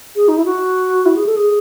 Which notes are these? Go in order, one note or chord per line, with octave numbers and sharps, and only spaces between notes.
G#4
D#4
E4
F#4
E4
G#4
A4
G#4